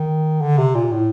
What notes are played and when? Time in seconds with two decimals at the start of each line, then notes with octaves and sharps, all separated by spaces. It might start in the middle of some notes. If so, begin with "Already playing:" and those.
Already playing: D#3
0.42 D3
0.58 C3
0.75 A#2
0.92 A2